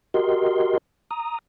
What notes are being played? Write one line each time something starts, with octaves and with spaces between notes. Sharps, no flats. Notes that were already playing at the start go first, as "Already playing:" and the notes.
F#4 G4 A#4 D#5 C6
A#5 D#6